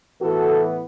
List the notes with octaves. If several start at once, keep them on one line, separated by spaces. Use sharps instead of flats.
A2 E3 B3 F#4 A4